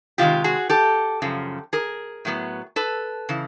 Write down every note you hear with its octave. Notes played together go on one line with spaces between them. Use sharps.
C3 D#3 G#3 F4 G4
F#4 G#4
G4 A4
F#2 C#3 F3
G#4 A#4
A2 F#3 B3
A4 B4
C#3 E3